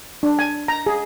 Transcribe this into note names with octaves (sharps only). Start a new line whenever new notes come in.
D4
G#5
A#5
G#4